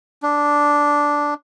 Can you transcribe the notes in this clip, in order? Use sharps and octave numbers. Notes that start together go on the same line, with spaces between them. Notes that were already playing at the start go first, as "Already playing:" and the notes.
D4